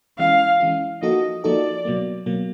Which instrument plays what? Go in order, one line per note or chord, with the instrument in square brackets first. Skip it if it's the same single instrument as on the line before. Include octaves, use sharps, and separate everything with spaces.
[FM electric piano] E3 G#3 C#4 E4 [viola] F5
[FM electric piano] E3 G#3 C#4 E4
[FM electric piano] F3 A#3 D#4 F#4 A4 [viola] D#5
[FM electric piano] F3 A#3 D#4 F#4 A4 [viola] D5
[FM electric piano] B2 F#3 A#3
B2 F#3 A#3